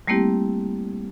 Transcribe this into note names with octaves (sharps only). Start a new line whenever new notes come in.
G3 A3 A#3 C4 E4 G4